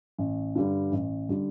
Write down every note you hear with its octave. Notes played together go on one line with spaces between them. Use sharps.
A1
G2 D3 G3
A1
D3 G3